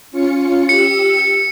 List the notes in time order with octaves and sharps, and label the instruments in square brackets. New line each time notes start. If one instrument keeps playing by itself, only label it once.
[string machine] C#4 F4 C#7
[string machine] G4 E6 [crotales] C#7